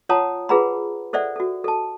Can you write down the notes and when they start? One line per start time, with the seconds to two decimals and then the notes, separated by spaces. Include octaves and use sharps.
0.09 F4 C#5 F#5 A5 A#5 D#6
0.49 F4 G#4 B4 F#5 A#5 B5
1.13 A4 C5 D5 E5 F#5
1.36 F#4 A4
1.64 A4 A5